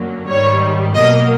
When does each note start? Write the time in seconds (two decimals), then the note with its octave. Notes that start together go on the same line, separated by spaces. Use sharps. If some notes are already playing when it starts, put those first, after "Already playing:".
Already playing: F#2 D3 F#3 A#3
0.26 G#2 D#3 G3 C#5
0.93 B2 F#3 A#3 D#5